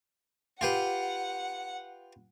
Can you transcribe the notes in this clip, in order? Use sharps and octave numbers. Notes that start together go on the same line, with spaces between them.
F4 G4 B4 F#5